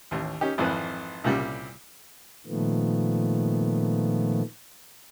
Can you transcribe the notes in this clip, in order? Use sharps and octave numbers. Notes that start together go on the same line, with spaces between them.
A1 D#2
C#4 D#4 G4
G#1 F2 E3 B4
C2 A#2 C#3 G3
A#2 D#3 F3 A3 B3